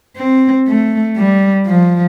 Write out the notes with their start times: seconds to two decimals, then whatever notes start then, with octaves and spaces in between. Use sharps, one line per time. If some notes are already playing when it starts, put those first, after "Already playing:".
0.17 C4
0.67 A3
1.17 G3
1.67 F3